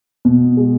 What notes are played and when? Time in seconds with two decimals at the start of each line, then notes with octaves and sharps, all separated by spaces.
0.25 B2
0.57 G#3